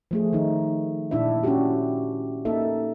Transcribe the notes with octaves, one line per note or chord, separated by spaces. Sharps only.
F3 A3 G#4
D#3 D#4
A#2 D4 E4 E5
C#4 D4 E4 F#4 G4
A#3 D#4 A4 E5